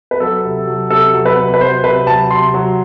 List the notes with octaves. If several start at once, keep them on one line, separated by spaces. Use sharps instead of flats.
B4
F#3 A4
C3
F#3
C3 A4
F#3
B4
C3
B4
F#3 C5
C3 B4
F#3 A5
C3 C6
F#3